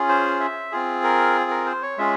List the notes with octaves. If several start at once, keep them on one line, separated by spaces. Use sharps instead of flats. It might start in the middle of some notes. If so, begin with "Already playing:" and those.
Already playing: C#4 F4 G#4
C5
E5
C4 F4 G#4
A#4
A#4
C5
C#5
G#3 C#4 F4 G#4 E5